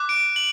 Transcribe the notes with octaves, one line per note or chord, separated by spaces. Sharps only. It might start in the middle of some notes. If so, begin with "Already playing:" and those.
Already playing: D6 F#6
D7
F#7